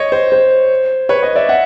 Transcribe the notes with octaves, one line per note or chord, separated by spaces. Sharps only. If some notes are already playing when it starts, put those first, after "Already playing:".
Already playing: C#5 D#5
C5
C5
B4 C#5
C#5 D#5
D5 E5
E5 F#5